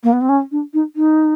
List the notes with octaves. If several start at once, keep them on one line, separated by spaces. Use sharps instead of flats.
A#3
B3
C4
C#4
D4
D#4
D#4